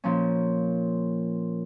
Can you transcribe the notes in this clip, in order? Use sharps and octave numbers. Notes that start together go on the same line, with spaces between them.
A#2 F3 C#4